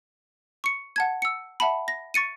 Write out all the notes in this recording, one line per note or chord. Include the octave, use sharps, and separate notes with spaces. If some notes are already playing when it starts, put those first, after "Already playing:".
C#6 C#7
F#5 A5 G#6
E6 C#7
E5 F#5 A5 B5
A#6
C#6 A6 C#7 D#7